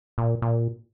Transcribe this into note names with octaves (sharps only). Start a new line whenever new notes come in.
A#2
A#2